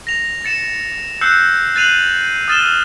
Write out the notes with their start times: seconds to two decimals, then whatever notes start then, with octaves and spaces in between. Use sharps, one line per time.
0.07 A#6 F7
0.45 A6 C#7 E7
1.21 E6 F#6 G6 C7 C#7
1.75 F#6 A6 C7 D#7 F7 F#7
2.48 D#6 F6 A6 D#7 E7 G7